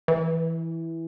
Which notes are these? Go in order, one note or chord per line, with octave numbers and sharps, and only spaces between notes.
E3